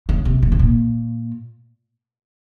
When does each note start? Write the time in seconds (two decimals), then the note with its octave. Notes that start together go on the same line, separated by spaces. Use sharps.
0.09 C#3
0.25 C3
0.42 A#2
0.52 C3
0.59 A#2